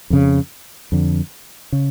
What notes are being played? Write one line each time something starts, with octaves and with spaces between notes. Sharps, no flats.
F2 C#3
F2 D3
C#3